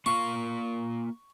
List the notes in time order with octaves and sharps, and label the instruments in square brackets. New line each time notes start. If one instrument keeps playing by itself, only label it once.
[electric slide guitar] A#3 F4 F5 [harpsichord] C#6